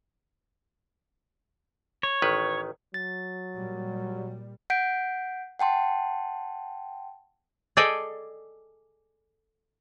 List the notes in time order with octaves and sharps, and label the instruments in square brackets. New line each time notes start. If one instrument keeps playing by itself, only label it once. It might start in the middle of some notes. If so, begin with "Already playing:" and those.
[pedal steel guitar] C#5
[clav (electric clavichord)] A1 D#3 B4
[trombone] F#3 [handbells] A6
[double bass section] A#2 G3
[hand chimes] F#5 G6 B6 D7
F#5 G5 A5 C6
[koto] G#4 A4 D5 D#5 G5 G#5